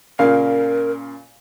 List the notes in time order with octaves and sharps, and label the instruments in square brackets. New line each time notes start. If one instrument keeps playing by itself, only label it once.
[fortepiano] A#2 C#3 F5 [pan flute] A#4